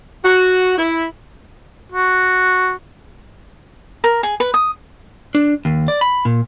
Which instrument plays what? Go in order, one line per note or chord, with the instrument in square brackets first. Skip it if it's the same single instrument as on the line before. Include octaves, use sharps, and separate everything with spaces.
[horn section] F#4
E4
[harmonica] F#4
[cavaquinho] A#4
G#4
B4
D#6
[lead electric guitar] D4
D#2
D5
B5
A#2